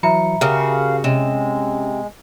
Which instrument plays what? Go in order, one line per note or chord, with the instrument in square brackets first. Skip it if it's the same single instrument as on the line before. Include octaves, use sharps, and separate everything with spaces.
[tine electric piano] E3 F#3 C#7 [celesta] E5 A#5 B5
[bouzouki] C#3 F#4 [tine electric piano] G4 A#4 [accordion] F5
[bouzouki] C3 [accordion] G#3 [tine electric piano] C#4 [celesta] E7